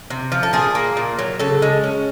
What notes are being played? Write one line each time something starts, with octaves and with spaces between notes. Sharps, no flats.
C3
F3
A4
A#2 G#4
A#3
A#2
F#3
C#3 A4
G#3
C#4